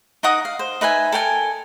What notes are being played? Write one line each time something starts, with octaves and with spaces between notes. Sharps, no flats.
D#4 A#4 F#5 D#6
F5
C5
D#4 B4 E5 G#5
A4 A#4 G5 G#5